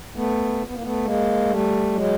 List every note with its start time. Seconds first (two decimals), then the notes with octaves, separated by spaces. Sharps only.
0.15 A3 B3
0.67 B3
0.75 A#3
0.83 A3 B3
1.05 G#3 A#3
1.50 G3 A3
1.94 F#3 G#3